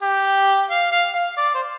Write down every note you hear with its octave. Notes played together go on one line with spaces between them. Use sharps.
G4
F5
F5
F5
D5
C5